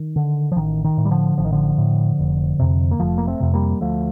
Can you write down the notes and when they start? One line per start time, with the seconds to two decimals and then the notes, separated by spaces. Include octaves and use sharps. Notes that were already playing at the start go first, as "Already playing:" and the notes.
Already playing: D#3
0.16 D3
0.52 F3
0.56 A1 D#3
0.84 D#3
0.98 A2
1.05 G3
1.11 D3 F3
1.38 A1 F3
1.45 D#3
1.52 D3 F3
1.78 A2
2.19 F1
2.59 F2 C3
2.91 A#3
3.00 F1 F3 A3
3.18 A#3
3.27 A3 C4
3.40 F2 C3
3.54 G3 A#3
3.81 D2 F3 A3